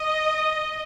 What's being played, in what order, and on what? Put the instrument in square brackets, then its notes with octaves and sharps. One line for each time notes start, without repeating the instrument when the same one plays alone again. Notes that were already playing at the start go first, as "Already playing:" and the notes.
Already playing: [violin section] D#5